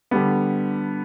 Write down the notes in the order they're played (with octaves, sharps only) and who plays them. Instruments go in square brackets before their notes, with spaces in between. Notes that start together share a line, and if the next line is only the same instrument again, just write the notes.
[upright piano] D3 G3 B3